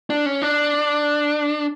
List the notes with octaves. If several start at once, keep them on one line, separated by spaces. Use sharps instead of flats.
D4
C#4
D4